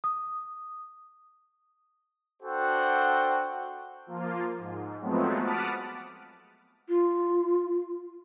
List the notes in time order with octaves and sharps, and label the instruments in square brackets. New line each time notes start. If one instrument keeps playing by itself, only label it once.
[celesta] D#6
[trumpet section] D4 F#4 A4 C5 F#5 G5
[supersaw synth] F3 A#3 F4
G#2
F3 F#3 G#3 A3 B3 C4
F#5 A5 B5 D6 D#6 F6
[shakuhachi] F4